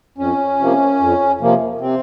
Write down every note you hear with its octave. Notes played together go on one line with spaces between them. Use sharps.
F2 C#4
C3 F3 A#3
F2
C3 F3 A#3
C3 C4